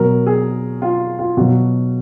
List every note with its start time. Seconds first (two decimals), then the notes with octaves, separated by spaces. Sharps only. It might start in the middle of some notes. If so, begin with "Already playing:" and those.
Already playing: B2 F#3 A#4
0.27 G#4
0.82 F4
1.19 F4
1.37 B2 F#3 F#4